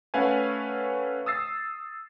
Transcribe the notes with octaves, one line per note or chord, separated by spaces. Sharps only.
A3 C#4 B4 F5 F#5 G#5
D#6 E6 A6 C7